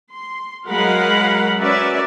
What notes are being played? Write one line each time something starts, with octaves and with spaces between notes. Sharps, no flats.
C6
F#3 G#3 A#4 F5 F#5 B5
C#4 F#4 A#4 B4 D5 E5